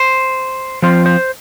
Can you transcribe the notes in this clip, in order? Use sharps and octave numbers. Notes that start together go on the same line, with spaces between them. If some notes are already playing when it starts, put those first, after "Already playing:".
Already playing: C5
F3 C4 F4 C5
C5